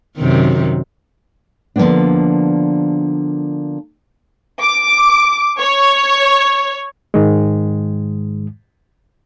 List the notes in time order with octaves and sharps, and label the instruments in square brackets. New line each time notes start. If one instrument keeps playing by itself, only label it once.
[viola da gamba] F#2 C3 D#3
[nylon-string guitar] D3 F3 G3 A#3 B3 D4
[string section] D6
C#5
[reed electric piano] G#2 D#3 G#3